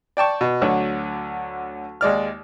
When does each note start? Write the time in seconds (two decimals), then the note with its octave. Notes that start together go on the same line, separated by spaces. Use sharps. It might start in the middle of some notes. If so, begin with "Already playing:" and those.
0.17 D5 G5 A5 C#6
0.41 B2
0.62 D2 D3 F#3
2.01 D#2 G#3 D5 F6